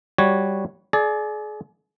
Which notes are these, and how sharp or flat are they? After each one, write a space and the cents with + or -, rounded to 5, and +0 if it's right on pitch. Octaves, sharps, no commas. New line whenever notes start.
G3 +0 F#4 +0 C#5 +0
G#4 +35 D5 +0